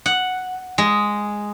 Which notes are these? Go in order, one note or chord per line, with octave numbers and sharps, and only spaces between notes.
F#5
G#3